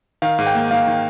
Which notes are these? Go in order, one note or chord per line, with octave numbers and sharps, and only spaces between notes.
D#3 F5
G#2
G5
A#3
G#2 F5
D#3